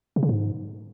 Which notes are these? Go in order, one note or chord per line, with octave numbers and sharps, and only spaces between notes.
C3
C#3
G#2